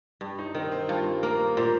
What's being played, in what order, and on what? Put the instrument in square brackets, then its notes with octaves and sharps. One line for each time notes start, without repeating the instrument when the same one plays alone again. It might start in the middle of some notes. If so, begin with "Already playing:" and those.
[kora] G2
[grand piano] D#4
[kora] D#3 [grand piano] C4
[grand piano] C4
[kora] G2 [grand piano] F4
[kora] A#3 [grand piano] A#4
[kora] A#2 [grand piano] C5